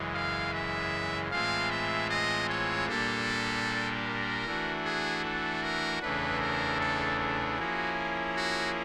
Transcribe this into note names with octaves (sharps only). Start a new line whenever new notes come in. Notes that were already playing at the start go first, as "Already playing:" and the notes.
Already playing: F#2 C#3 E3 G#3
F5
E5
A2 E3 G#3 C4 F4 F5
E5
D#5
C#5
A#2 G3 A#3 D4 G4 A4
A#4
E3 A3 D4 F#4
G#4
A4
A#4
E2 C#3 E3 A3 D4 B4
A#4
A4
A4
F3 A#3 C#4 E4 F#4 G#4
F#4